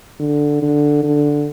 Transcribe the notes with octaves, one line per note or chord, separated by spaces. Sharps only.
D3
D3
D3